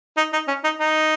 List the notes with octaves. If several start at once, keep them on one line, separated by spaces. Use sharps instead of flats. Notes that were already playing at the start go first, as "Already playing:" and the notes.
D#4
D#4
C#4
D#4
D#4